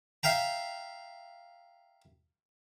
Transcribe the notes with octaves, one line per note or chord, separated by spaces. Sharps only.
E5 F5 G5 A#5